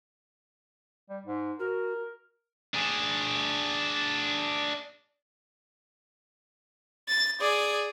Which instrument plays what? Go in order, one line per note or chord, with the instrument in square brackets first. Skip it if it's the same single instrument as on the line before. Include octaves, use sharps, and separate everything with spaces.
[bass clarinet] G3
G#2
[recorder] F#4 [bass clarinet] A#4
[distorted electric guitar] D4 G#4
[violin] A6
G#4 D5